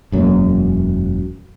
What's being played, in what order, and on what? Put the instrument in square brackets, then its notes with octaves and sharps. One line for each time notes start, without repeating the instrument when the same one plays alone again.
[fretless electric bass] E1 F#2 F#3 A#3